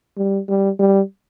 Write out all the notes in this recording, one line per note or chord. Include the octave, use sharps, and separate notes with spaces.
G3
G3
G3